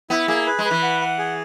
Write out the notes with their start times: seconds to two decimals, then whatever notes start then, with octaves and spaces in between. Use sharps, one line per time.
0.10 B3 E4
0.28 A#3 G#4
0.47 B4
0.59 G#3
0.65 B4
0.71 E3
0.83 F#5
1.01 F#5
1.19 G#4